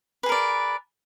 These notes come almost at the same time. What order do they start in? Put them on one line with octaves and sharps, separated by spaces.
B4 G#4 A#4 D5